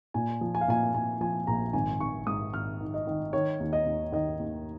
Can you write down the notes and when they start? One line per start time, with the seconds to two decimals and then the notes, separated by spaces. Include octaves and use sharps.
0.14 A#2 G#5
0.41 F3
0.55 G#5
0.61 F5
0.68 A#2 G#5
0.94 A#2 G#5
1.21 F3 G#5
1.47 A#1 A#5
1.73 G#1 G#5
2.00 G#1 C#6
2.27 G#2 D#6
2.53 G#1 F6
2.81 D#3
2.94 D#5
3.07 D#3
3.33 D#3 C#5
3.60 D#2
3.73 D#5
3.86 D#2
4.12 D#3 D#5
4.39 D#2